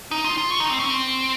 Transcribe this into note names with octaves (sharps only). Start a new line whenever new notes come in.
D#4
F4
F4
F#4
D#4
C4
C#4
C4